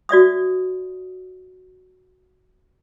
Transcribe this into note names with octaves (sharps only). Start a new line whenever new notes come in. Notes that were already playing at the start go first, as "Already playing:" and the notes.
F#4 D5 E5 D#6